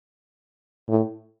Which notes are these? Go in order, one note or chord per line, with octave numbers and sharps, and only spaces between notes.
A2